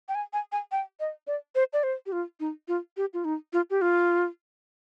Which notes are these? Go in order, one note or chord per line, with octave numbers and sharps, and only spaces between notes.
G5
G#5
G#5
G#5
G5
D#5
D5
C5
D5
C5
G4
F4
D#4
F4
G4
F4
D#4
F4
G4
F4